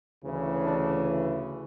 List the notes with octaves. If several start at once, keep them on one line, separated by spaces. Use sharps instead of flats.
D2 C#3 E3
D4